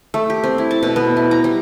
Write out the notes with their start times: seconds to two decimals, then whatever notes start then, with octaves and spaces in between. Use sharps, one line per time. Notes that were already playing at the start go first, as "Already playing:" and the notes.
0.14 A3
0.30 G4
0.44 C4
0.58 E4
0.71 A5
0.83 B2
0.96 B3
1.17 E4
1.31 A#5
1.44 G3